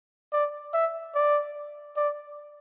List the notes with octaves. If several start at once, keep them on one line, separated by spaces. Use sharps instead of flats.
D5
E5
D5
D5